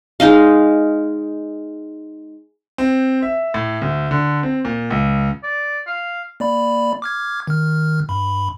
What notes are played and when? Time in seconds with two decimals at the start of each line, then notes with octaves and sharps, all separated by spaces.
0.20 G#3 D#4 D#5 F5
2.78 C4
3.22 E5
3.54 A2
3.81 D2
4.11 D3
4.43 C4
4.65 A#2
4.90 C#2
5.43 D5
5.87 F5
6.40 A#3 D5 B5
7.02 D6 F6 G#6
7.47 D#3 F6
8.09 G2 B5